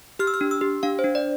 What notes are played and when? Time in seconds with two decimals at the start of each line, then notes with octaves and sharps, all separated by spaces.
0.19 G4 F6
0.27 E6
0.34 F6
0.41 D4
0.51 E6
0.61 G4
0.83 D4 F5
0.99 C5
1.04 D4
1.15 D5